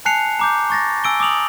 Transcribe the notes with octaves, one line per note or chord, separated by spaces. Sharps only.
G#5 A5 F#6 C7 C#7 F7
A#5 D6 G6
C#6 A6 A#6
G#5 E6 D7 G7
D6 D#6 F7 F#7